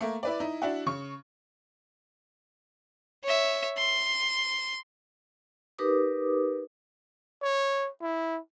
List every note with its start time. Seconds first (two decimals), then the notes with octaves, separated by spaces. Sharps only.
0.01 A3 A#3
0.23 E4 B4 D5
0.40 D#4 E4
0.62 D4 E4 F#4
0.86 C#3 C#6
3.24 C#5 E5
3.78 C6
5.78 D#4 G4 A#4 B4 D6 D#6
7.42 C#5
8.01 E4